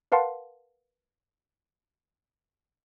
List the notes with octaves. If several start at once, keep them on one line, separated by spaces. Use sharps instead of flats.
A#4 B4 F5 F#5 A5 C6